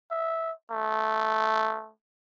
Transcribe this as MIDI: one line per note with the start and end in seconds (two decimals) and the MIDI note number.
0.11 0.52 76
0.71 1.90 57